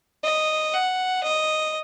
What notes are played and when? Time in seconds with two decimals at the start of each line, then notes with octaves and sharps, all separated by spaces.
0.24 D#5
0.73 F#5
1.23 D#5